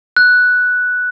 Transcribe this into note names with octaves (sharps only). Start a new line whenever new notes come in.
F#6